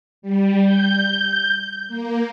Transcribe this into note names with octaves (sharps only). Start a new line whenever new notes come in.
G3
G6
A#3